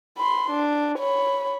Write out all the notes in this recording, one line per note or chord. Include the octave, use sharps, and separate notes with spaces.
B5 C6
D4
C#5 B5